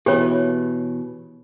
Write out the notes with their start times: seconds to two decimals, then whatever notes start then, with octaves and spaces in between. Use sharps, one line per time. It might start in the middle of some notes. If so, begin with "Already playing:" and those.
0.06 B2 E3 G4 C#5